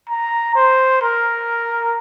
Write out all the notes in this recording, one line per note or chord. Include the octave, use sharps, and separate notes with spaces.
A#5
C5
A#4